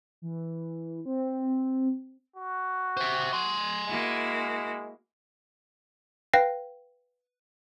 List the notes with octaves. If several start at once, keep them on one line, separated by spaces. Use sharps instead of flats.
E3
C4
F#4
C5 E5
G#5 C6
G#3 A#3 E4 F#4
B4 F5 G5 A#6 C7